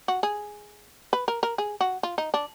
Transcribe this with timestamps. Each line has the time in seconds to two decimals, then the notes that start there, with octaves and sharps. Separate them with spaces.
0.08 F#4
0.23 G#4
1.13 B4
1.28 A#4
1.43 A#4
1.58 G#4
1.81 F#4
2.03 F4
2.18 D#4
2.34 D4